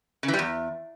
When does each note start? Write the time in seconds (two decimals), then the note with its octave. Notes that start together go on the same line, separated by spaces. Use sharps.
0.23 C#3
0.28 E3
0.34 G3
0.39 E2